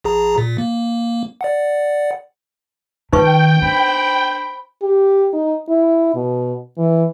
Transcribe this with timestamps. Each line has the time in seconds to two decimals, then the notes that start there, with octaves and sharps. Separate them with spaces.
0.04 A#1 G#4 A#5
0.38 A#2
0.58 A#3
1.41 D5 F#5
3.13 D#3 D#4 B4 G5 C#6
3.62 D4 C5 B5
4.82 G4
5.33 D#4
5.69 E4
6.15 B2
6.78 E3